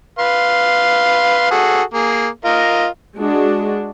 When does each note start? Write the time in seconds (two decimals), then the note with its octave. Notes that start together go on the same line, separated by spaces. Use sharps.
0.19 B4 F5 C6
1.51 F#4 G#4 A4
1.94 A#3 G#4
2.45 F4 A#4 D#5
3.17 G#3 D4 F#4